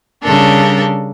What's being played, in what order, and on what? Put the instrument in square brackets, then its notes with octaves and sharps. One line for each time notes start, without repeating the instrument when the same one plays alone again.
[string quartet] C#3 G3 D4 A4 A#4